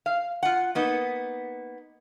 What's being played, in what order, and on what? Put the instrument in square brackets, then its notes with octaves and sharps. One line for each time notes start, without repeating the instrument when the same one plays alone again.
[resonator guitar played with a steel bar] F5
F4 F#5
A#3 B3 D#4